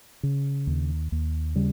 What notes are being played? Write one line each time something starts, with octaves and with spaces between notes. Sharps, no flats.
C#3
D#2
D#2
C#3 G3